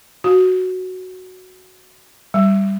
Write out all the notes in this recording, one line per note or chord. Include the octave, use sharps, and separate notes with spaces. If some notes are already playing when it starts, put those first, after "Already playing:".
F#4
G3